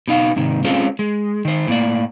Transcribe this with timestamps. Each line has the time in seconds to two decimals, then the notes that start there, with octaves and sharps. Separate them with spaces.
0.08 B2 D#4 F5
0.36 G#2 C3 D#3
0.64 G#3 C4 C#4 F4 A4
0.99 G#3
1.45 D#3 C5
1.67 A2 A#3 D5